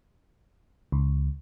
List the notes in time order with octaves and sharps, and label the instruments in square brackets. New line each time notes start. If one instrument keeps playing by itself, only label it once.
[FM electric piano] C#2